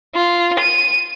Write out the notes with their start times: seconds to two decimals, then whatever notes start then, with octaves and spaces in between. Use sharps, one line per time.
0.15 F4
0.59 D#7